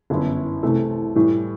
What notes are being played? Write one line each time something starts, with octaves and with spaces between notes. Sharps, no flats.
G1 F#2 E3 B3 E4
C2 C3 E3 A3
A2 E3 G3